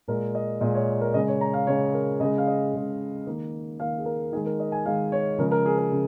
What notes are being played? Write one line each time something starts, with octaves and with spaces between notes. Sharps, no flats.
A#2 G#3 A#4
D#5
A#2 G#3 D#5
C#5
A#4
C#3 G#3 D#5
C#5
A#5
F5
C#3 G#3 C#5
A#4
C#3 G#3 D#5
F5
D#5
C#3 G#3
D#3 A#3
D#3 A#3 F5
G#4
A#4
D#3 G#3 G#4
A#4
D#5
G#5
D#3 G#3 F5
C#5
C#3 F3 G#3 A#4
A#4
G#4
A#4
C#3